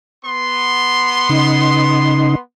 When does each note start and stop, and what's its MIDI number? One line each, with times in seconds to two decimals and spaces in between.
0.24 2.39 59
0.24 2.39 84
1.29 2.35 49
1.29 2.35 63